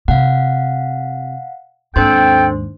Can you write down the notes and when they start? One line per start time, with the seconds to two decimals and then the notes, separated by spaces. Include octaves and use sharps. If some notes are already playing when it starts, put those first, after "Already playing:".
0.08 C3 F5 F#5
1.96 D#2 G#2 C4 D4 A4 C5 G5 C6